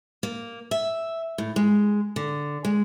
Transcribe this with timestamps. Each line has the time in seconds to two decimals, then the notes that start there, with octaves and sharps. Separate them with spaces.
0.23 A#3
0.71 E5
1.38 A2
1.56 G#3
2.16 D3
2.65 G#3